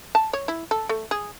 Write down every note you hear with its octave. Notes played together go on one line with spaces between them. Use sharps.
A5
C#5
E4
A4
A3
G#4